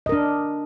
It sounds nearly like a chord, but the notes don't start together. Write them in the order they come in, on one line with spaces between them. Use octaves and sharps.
D#5 A#4 D4